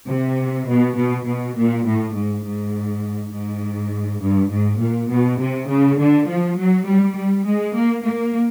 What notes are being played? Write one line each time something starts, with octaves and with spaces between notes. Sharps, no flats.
C3
B2
B2
B2
A#2
A2
G#2
G#2
G#2
G2
G#2
A#2
B2
C3
C#3
D3
F3
F#3
G3
G3
G#3
A#3
A#3